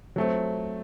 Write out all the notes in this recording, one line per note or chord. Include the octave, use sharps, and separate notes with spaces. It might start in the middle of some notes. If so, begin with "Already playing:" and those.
F#3 A3 C4